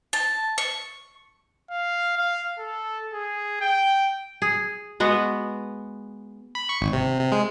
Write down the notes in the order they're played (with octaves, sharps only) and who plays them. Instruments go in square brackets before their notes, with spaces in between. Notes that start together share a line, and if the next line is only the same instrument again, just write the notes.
[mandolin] A5
C#6
[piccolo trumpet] F5
F5
A4
G#4
G5
[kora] G#4
G#3 B3 F#4 B4
[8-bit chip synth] B5
C#6
G#1
C3
C3
G#3